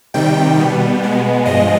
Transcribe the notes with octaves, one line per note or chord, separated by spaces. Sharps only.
C3 D#3 G3 G5
B2 G3 B3
B2 G#3 B3
G2 F3 G#3 D#5